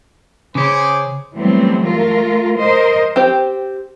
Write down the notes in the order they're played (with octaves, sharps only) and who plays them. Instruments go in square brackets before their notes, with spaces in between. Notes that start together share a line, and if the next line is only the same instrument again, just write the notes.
[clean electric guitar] C#3 C#4 [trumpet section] G#4 C5 D6
[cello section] E3 F#3 G3 A3 B3 C4
A3 F4 A#4
A#4 C5 D#5
[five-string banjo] C4 G4 C5